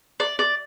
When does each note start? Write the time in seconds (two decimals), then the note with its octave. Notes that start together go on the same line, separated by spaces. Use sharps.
0.20 D5
0.39 D5